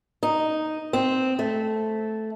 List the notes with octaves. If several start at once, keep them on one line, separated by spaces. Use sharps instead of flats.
D#4
C4
A3